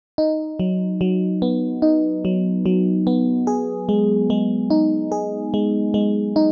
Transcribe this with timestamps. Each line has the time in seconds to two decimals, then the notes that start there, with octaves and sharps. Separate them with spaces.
0.18 D#4
0.59 F#3
1.01 F#3
1.42 B3
1.82 D#4
2.25 F#3
2.66 F#3
3.07 B3
3.47 G#4
3.89 G#3
4.30 G#3
4.70 D#4
5.12 G#4
5.54 G#3
5.94 G#3
6.36 D#4